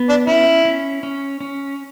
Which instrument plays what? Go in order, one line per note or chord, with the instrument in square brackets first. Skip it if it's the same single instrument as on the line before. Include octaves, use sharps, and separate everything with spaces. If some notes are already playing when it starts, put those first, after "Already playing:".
Already playing: [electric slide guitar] B3
[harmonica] D4
[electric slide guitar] C#4 [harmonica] E4
[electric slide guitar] C#4
C#4
C#4